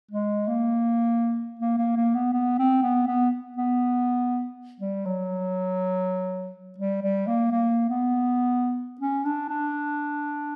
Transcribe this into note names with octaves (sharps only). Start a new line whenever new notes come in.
G#3
A#3
A#3
A#3
A#3
B3
B3
C4
B3
B3
B3
G3
F#3
G3
G3
A#3
A#3
B3
C#4
D4
D4